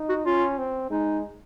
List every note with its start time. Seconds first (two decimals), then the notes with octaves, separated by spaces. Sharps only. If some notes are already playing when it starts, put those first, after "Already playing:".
Already playing: D#4
0.09 F#4
0.26 C#4 F4
0.58 C4
0.90 G#3 D#4